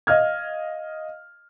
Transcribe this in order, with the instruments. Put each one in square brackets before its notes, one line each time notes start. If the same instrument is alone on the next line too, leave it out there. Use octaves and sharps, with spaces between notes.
[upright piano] D#5 F5 F6 G#6